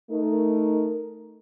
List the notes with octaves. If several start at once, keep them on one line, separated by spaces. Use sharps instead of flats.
A3 D#4 A#4